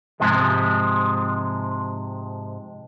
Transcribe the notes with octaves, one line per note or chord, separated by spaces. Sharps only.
G#2 C3 F3 G#3